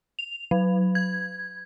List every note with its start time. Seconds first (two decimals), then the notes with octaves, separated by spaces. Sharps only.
0.19 F7
0.51 F#3
0.95 G#6